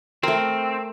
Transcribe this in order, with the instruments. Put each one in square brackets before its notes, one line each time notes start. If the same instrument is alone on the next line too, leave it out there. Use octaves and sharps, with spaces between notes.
[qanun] A3 A#4 [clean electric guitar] C4